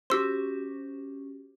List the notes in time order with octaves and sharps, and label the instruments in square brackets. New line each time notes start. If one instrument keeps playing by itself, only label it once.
[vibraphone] C#4 [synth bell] F#4 G4 C5 [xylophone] C6 E6